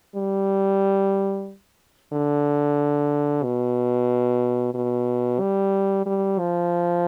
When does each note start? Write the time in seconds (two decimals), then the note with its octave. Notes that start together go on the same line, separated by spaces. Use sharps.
0.16 G3
2.13 D3
3.44 B2
4.74 B2
5.40 G3
6.06 G3
6.39 F3